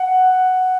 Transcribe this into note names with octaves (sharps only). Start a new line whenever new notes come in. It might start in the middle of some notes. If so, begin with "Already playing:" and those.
Already playing: F#5